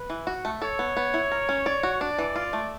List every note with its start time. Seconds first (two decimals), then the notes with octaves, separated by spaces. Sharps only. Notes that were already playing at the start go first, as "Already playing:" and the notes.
Already playing: B4
0.10 E3
0.27 F#4
0.45 A3
0.62 A4 C#5
0.79 B3
0.97 B3
1.14 E4
1.32 A#4
1.49 C#4
1.66 D5
1.83 F#4
2.01 D4 D5
2.18 E3
2.36 F4
2.53 A3